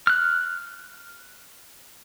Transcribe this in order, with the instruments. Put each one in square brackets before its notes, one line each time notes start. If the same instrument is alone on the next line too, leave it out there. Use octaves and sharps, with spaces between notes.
[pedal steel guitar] F6 F#6